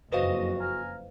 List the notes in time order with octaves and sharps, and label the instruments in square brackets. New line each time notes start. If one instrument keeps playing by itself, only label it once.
[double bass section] F#1 F2 [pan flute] F#4 [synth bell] B4 C5 F5 [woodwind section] D#5
[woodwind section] G#5 A#5 F6